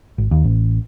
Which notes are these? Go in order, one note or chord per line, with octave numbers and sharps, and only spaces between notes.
G#1
D#2
A1